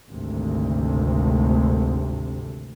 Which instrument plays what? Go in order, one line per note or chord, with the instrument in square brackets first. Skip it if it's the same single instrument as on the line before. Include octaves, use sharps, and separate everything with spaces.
[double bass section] G#1 D2 C3